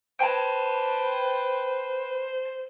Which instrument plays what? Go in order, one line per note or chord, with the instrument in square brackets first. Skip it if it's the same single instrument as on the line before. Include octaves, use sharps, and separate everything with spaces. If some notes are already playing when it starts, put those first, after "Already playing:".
[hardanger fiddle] B4 [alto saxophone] C5 [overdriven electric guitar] G5 A5